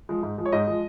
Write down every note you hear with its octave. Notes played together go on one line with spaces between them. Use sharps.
F3 G#3
G#2
F3 G#3
C#5
G#2 D#5
F3 G#3